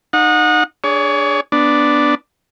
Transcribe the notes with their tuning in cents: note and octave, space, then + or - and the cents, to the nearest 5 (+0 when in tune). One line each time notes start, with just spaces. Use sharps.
D#4 -20 F#5 -30
D4 +0 G#4 +0 C#5 +30
B3 +0 D4 +0